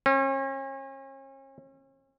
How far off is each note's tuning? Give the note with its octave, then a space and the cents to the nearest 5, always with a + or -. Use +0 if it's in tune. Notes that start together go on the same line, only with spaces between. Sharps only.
C#4 -40